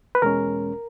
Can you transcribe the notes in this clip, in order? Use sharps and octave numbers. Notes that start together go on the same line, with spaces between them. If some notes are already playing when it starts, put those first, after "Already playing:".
B4
E2 B2 G#3 C#4 A#4